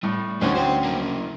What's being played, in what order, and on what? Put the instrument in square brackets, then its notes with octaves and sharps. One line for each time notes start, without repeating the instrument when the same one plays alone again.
[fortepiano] A2 [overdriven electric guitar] G3
[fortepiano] D2 C#4 [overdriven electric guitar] D#4 G4
[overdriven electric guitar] C5 G5
F#3 A#3